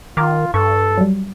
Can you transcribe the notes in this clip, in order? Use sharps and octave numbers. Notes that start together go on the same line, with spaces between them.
D#3 F4 A#5 D6 F6
G2 A4 C#6
F#3 G3